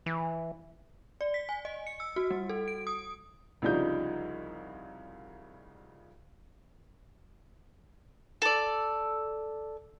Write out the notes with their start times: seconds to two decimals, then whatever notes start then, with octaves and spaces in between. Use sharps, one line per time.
0.06 E3
1.21 D5
1.34 B6
1.49 G#5
1.65 D#5
1.87 C#7
2.00 E6
2.16 F#4
2.31 G3
2.49 A4
2.68 D7
2.87 D#6
3.62 C2 C#3 F3 G3 D#4 G6
8.42 A4 D5